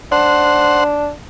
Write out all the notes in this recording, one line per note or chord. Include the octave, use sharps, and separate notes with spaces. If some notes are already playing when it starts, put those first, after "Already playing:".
D4 C5 F#5